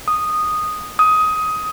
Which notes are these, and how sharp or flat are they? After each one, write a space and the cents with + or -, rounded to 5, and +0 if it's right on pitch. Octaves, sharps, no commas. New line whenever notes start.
D#6 -10
D#6 +15